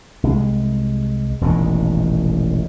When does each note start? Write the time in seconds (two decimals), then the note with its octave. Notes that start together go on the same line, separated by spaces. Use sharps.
0.23 C2 G#3
1.41 E1 A1 A#2 D#3